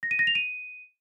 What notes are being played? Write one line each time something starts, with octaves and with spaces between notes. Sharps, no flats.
A#6
D#7
A#6
F7
D#7